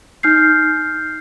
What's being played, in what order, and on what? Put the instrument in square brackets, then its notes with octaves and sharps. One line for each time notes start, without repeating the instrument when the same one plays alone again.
[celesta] D#4 F6 G6 C7